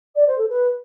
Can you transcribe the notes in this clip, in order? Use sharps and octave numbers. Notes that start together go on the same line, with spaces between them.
D5
C5
A4
B4